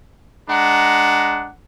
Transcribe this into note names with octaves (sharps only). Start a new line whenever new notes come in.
G#3 D4 F#5 A#5